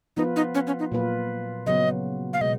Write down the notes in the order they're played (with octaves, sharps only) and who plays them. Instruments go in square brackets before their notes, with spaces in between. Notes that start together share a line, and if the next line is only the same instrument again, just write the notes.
[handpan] F3 B3 F4 B4 [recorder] D#4
[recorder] D#4
C#4
C#4
D#4
[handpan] A#2 F#3 A#3 F4 B4
[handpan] C#3 F#3 B3 [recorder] D#5
[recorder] F5
[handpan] B2 G#3 [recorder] D#5